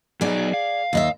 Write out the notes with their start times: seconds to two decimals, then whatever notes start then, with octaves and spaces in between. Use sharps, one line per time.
0.21 F#3 B3 D#4 G#4 D5
0.54 F5
0.93 D#2 D#5 E5